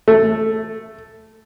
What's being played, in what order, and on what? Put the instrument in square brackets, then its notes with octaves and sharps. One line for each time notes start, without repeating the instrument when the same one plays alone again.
[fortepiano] A3